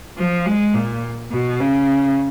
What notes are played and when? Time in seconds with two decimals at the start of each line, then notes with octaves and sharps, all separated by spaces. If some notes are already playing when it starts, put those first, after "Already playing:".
0.17 F3
0.46 G#3
0.74 A#2
1.32 B2
1.60 C#3